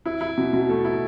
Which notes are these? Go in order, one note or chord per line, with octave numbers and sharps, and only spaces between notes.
E4
E4
B2
B2
A3
E4